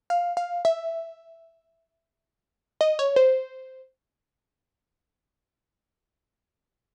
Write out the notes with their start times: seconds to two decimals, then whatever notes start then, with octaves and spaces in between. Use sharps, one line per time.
0.10 F5
0.37 F5
0.65 E5
2.81 D#5
2.99 C#5
3.16 C5